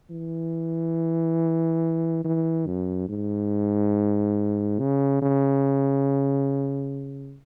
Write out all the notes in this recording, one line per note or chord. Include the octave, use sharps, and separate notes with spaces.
E3
E3
F#2
G#2
C#3
C#3